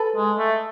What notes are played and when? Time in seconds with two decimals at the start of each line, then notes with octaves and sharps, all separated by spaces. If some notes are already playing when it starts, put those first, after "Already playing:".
Already playing: A4 B4
0.16 G#3
0.38 A3